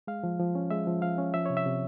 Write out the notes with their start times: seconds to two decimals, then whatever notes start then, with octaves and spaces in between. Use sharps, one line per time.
0.07 G#3 F5
0.23 F3
0.39 F3
0.55 C#4
0.71 G#3 E5
0.87 F3
1.02 F3 F5
1.18 C#4
1.34 F3 E5
1.46 C3 C#5
1.57 E5
1.66 C3